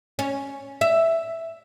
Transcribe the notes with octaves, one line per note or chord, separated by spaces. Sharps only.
C#4
E5